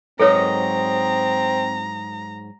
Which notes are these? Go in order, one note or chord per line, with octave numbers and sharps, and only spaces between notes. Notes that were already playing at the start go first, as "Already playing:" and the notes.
G#2 F#3 C4 A4 B4 C#5 D#5 A#5